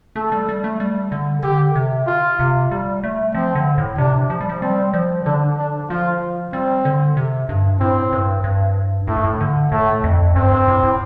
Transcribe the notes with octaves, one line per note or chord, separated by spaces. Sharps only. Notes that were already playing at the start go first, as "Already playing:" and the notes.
A3 A4
G3
G3
A3
G3
D3
D3 G4
C3
F4
C3
G3
A3
F3 C4
D3
A2
C3 D4
F3
G3
F3
G3 C4
F3
D3 D4
D4
F3 F4
G3 C4
D3
C3
G2
A2 C4
G2
G2
A2 A3
G2
A2
D3
A2 A3
F2
G2 C4
G2
A2
A2